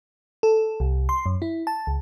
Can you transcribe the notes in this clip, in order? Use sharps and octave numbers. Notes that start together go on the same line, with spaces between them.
A4
C2
C6
F#2
E4
A5
C#2